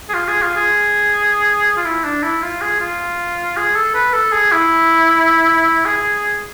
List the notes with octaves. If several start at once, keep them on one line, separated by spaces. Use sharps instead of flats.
G#4
F4
G#4
F4
G#4
F4
E4
D4
E4
F4
G#4
F4
G#4
A4
B4
A4
G#4
E4
G#4